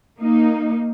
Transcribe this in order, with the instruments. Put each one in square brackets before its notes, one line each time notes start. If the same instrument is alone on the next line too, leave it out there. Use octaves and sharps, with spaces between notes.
[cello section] A#3 D#4